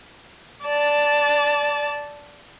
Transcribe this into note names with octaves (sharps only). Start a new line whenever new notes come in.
D5 A5